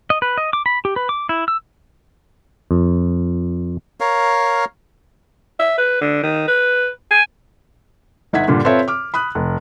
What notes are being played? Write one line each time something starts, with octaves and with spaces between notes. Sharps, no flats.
D#5
B4
D#5
D6
B5
G4
B4
D6
E4
E6
F2
A#4 C#5 F5
E5
B4
D3
D#3
B4
G#5
G1 D#4 E5 F#5 G#6 B6
G2 A#2 D3
C4 F4 A4 B4 C#5 E5
D6 F6
B5 D#6 F#6
F1